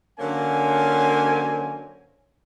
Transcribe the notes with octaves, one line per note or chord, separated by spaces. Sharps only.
D3 F#3 A#3 C#4 C5 G#5